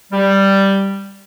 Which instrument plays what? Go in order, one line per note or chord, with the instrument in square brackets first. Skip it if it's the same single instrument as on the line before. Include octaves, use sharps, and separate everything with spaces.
[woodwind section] G3